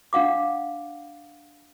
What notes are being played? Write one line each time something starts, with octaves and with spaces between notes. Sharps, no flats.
D4 F5 F#5 D6